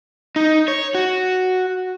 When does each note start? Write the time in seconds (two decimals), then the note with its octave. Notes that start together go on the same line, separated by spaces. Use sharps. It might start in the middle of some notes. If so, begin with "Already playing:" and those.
0.36 D#4
0.68 C#5
0.95 F#4